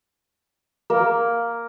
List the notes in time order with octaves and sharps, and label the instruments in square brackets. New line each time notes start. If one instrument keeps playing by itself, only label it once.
[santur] A#3